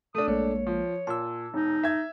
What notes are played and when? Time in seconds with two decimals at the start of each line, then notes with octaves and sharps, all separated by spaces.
0.15 A3 D4 D#6
0.28 A#1 G#3 A#3 C#5
0.67 F3
1.07 A#2 A5 E6
1.54 E1 D#4
1.83 E5 G#6